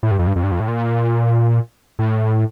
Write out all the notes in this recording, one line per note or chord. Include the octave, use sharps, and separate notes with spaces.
A2
G2
F2
G2
F2
G2
F2
A2
A#2
A2